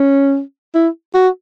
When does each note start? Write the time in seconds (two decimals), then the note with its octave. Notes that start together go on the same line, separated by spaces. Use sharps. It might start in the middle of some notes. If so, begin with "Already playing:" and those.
Already playing: C#4
0.75 E4
1.14 F#4